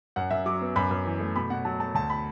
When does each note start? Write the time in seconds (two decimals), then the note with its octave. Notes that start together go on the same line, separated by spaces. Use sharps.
0.16 F#2 F#5
0.31 F#2 E5
0.46 F#3 D6
0.61 B3
0.76 F#2 B5
0.91 F#2
1.06 E3
1.20 A3
1.36 B2 B5
1.50 B2 F#5
1.65 F#3 A5
1.80 A3 A5
1.94 D2 A5
2.10 B5